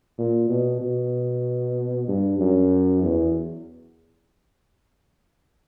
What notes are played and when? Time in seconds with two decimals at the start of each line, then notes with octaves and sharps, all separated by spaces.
0.18 A#2
0.49 B2
0.81 B2
2.08 G2
2.39 F#2
3.03 E2